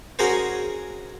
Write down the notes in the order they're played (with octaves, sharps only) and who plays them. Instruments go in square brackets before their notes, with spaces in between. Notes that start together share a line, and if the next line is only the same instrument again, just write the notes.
[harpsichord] C#4 F#4 G#4 A#4 C5